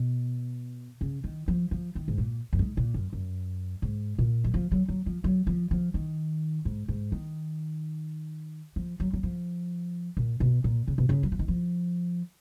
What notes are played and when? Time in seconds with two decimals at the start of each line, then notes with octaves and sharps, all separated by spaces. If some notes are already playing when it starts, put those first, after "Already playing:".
Already playing: B2
1.01 C#3
1.24 D#3
1.48 F3
1.71 F3
1.95 D#3
2.08 G#2
2.18 A#2
2.53 F#2
2.59 G#2
2.77 A#2
2.94 F#2
3.13 F#2
3.82 G#2
4.19 A#2
4.44 F#3
4.54 F3
4.72 F#3
4.88 F#3
5.06 F3
5.24 F#3
5.47 F3
5.71 F3
5.94 D#3
6.65 G#2
6.88 G#2
7.12 D#3
8.76 F3
9.00 F#3
9.13 F#3
9.23 F3
10.17 A#2
10.40 B2
10.64 A#2
10.88 C#3
10.98 B2
11.09 C#3
11.23 F#3
11.32 F3
11.39 D#3
11.48 F3